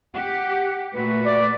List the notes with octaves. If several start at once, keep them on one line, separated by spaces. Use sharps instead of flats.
G4 F#5
A#2 A3 F#4 B4
D5